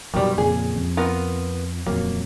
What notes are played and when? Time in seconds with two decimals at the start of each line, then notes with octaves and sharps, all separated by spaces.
0.14 F#2 B2 D#3 G3
0.38 F2 A#2 C#3 G#4
0.76 F2
0.97 B3 F4 A#4
1.86 D#1 F2 F#3 A#3